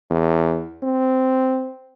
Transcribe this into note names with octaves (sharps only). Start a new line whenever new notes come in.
E2
C4